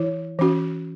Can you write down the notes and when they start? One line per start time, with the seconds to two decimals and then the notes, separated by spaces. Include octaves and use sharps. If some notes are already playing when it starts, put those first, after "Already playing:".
Already playing: E3 E4 C#5
0.39 E3 C#4 F#4